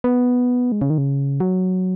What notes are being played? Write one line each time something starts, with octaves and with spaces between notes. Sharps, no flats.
B3
G#3
C#3
D#3
C#3
F#3